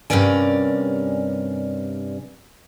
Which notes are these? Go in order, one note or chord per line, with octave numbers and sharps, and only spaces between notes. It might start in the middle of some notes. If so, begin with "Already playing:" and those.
G2 C3 C#4 A#4 D5 G#5